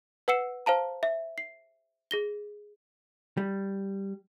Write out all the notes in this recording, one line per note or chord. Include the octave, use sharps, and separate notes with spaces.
B4 F#5 E6 C7 C#7 E7
C5 F5 A5 A#5
E5
C7
G#4 A#6 G7
G3